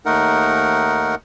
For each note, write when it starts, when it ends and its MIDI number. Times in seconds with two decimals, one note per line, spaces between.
0.06 1.15 39
0.06 1.15 57
0.06 1.15 63
0.06 1.15 70
0.06 1.15 78